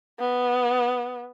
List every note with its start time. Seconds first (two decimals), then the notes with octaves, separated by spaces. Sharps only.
0.19 B3